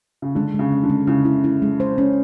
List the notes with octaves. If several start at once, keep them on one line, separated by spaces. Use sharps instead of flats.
C#3
D3 G#3
C#3 G#3
C#4
D3
G#3
C#3 E4
E4
E4
G#3
C5
C#4